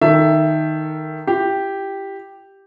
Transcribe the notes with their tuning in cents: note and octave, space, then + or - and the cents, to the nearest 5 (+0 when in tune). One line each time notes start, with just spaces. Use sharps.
D#3 +0 A4 +20 E5 +10
E4 +45 G4 +0